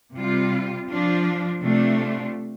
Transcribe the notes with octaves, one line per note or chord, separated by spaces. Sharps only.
C3 G3 F4
F3 D4 F4
C3 A3 D4 F4